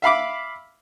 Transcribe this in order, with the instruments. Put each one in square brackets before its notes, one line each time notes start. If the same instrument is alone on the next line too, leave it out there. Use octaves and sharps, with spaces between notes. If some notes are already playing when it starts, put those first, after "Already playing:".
[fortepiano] E5 F5 B5 D6